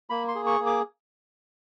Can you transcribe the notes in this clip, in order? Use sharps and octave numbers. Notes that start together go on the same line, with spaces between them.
A#3 B5
C6
G#4
C#6
A#3
D6